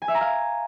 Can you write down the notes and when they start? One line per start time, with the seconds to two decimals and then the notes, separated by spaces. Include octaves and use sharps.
0.02 G#5
0.08 E5
0.14 A#5
0.21 F5